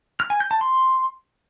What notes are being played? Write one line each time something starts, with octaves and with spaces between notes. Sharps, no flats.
F6
G#5
G6
A5
C6